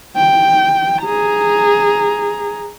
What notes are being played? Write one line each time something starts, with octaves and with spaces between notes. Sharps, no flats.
G5
G#4 A#5